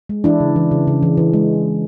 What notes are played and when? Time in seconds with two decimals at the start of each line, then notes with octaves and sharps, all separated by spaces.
0.09 G#3
0.24 E3 D4 E4
0.40 C#3
0.56 E3
0.71 C#3
0.87 C#3
1.03 E3
1.17 E3
1.33 G#3